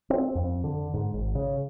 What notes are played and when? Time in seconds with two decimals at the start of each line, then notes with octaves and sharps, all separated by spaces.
0.10 C4
0.35 F2
0.64 D3
0.94 G#2
1.14 G#1
1.35 C#3